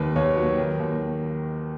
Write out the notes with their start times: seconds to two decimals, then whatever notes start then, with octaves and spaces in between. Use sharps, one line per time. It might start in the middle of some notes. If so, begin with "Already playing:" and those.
Already playing: D#2 D#3 B4
0.16 D#2 C#5
0.36 F#3
0.58 D#3
0.80 D#2